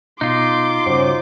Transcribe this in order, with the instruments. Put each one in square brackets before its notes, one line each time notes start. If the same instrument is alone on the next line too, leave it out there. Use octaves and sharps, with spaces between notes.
[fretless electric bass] B2 [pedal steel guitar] D#4 F4 [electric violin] C6 D6
[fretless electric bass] G2 C#3 [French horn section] C#4 F#4 C5